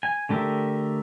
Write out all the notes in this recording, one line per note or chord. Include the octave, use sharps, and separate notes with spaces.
G#5
D3 A3 G4 A#4 E5